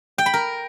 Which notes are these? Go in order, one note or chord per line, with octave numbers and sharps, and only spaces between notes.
G5
B5
A#4